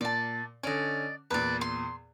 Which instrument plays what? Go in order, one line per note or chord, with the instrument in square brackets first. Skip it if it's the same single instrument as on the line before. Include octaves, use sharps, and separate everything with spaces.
[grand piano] A#2 [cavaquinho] D5 A5
[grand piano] D3 C#4 [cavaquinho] D5 D#5
[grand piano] E2 A#2 [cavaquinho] B4 D5
[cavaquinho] C6